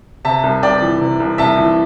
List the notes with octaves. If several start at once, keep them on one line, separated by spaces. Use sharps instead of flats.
C3 E5 A5
C2
C2 D5 G5
E3
C3
C2
C2 E5 A5
E3